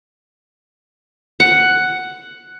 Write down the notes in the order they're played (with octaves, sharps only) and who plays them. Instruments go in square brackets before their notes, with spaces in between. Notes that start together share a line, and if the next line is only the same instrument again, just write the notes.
[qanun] F#5